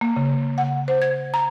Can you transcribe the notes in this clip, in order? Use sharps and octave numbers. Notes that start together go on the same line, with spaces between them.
A#3
C#3
F#5
C5
G#6
A#5